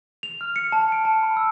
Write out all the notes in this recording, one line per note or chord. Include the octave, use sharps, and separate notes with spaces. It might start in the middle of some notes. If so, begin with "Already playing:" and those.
F7
F6
C#7
A5
D7
A5
B5
E6